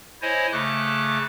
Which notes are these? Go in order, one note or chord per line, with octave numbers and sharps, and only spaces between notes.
E4 C5 C#5 D#5 G#5
C#3 A3 D6 F#6